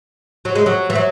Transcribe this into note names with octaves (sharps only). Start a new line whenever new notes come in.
F#3
G#3
F#3
E3
F#3